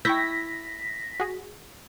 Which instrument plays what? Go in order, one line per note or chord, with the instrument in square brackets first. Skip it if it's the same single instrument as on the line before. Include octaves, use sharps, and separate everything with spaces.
[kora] E4 [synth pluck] G5 C#6 G6 [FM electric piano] A#6 B6
[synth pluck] F#4 G#4